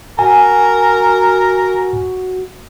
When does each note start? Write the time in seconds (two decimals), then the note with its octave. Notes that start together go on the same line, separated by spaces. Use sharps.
0.19 F#4 A#4 G#5